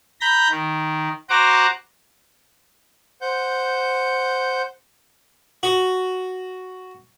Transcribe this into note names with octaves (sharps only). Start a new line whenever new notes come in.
A#5 B5 G6 A#6
D#3
F#4 C5 F#5 A#5 D6
C5 F#5 G6
F#4